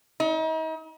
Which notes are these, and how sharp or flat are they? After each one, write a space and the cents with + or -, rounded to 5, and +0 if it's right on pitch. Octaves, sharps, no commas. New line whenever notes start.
D#4 +40